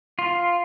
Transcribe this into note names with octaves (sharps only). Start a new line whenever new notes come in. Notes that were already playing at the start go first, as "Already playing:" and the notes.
F4